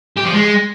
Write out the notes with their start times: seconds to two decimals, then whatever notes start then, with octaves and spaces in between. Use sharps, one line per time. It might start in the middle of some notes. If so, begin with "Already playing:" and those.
0.17 G4
0.25 F3
0.32 G#3